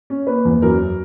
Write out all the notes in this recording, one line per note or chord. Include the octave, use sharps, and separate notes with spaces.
C#4
A#3 B4
E2
F#2 A#4